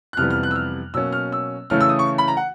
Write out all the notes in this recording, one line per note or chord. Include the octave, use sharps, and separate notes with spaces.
F#6
F2 C3 E3 G3 B3 F6
F6
F#6
E6
F6
B2 F#3 A#3 C#4 E6
F6
E6
C#3 E3 A3 C#4 F6
E6
D#6
C#6
B5
A#5
F#5